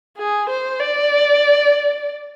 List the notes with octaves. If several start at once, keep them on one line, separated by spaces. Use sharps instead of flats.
G#4
C5
D5